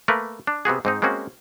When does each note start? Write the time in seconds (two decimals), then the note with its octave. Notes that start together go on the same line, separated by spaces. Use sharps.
0.08 A3 A#3 A#4 B4
0.47 D4
0.65 C3 B3 F#4 G#4
0.85 G#2 C4 D#4
1.02 G#3 A#3 C4 C#4 F#4